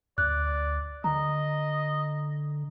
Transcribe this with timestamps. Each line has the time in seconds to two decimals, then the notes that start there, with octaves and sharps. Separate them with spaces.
0.18 D2 D5 F#6
1.04 D3 D#5 A#5